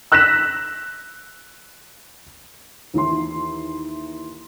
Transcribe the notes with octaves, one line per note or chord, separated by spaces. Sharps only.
E6 F#6 A#6 B6 E7
D#2 E3 E4 C6